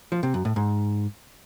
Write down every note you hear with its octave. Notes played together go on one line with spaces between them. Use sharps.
F3
C3
F#2
A2
G#2